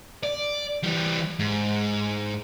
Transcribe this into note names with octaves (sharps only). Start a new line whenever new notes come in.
D5
E3 G3
G#2